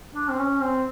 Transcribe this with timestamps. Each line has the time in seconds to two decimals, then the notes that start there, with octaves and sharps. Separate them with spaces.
0.14 D4
0.30 C4
0.38 C#4
0.62 C4